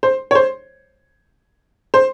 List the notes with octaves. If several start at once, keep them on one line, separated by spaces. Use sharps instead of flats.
C5
C#5
C5
C5